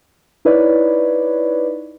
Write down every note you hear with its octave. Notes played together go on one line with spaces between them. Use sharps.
D#4 E4 B4 C#5 D5